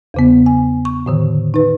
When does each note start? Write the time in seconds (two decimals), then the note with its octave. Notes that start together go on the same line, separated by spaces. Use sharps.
0.14 E2 C#3 B3
0.46 G#5
0.85 C#6
1.06 A2 D3 D#3
1.54 D#4 B4